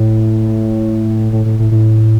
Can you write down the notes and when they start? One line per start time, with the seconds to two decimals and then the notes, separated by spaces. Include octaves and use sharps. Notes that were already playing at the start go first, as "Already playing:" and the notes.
Already playing: A2
1.32 A2
1.45 A2
1.59 A2
1.71 A2